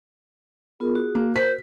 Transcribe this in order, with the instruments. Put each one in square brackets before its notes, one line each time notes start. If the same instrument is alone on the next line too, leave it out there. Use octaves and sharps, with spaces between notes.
[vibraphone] B3 F4 A#4 [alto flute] G#4
[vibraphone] F#4
[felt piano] A#3
[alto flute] A#4 [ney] C5 [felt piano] B6